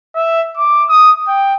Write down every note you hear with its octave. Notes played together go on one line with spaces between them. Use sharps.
E5
D6
D#6
G5